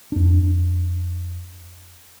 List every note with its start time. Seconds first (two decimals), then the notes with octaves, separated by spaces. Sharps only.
0.12 F2 D4